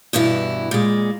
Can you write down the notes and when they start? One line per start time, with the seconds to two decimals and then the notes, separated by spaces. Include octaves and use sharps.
0.13 G2 B2 E3 E4
0.71 A#2 G#3